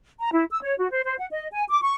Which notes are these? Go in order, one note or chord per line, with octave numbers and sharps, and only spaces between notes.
A#5
E4
E6
C#5
F#4
C5
C5
F#5
D#5
G#5
D6
C#6